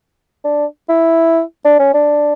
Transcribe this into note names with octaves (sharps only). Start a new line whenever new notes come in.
D4
E4
D4
C#4
D4